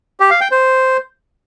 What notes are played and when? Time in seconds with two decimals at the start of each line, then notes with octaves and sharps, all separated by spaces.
0.20 G4
0.30 F5
0.41 G5
0.51 C5